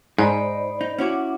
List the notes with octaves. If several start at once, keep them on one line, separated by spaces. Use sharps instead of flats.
G#2 D#4 C5 D5 B5
D#4
C#4 E4 F#4 F#5 D6